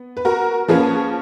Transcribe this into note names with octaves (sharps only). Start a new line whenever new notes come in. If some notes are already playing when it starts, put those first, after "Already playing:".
Already playing: B3
B4
F#4 A#4
F3 A#3 C#4 G#4 B4